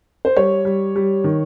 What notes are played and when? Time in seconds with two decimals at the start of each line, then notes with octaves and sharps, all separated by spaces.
0.25 C5
0.36 G3 C#5
0.65 G3
0.96 G3
1.24 D#3